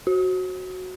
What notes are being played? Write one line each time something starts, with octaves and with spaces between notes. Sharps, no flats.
F#4